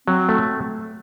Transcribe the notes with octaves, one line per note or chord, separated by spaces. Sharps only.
F#3 C4
A3